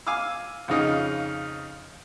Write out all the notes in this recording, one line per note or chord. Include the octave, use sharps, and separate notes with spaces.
F5 G#5 D6 E6 F6
F2 C#3 D#4 F4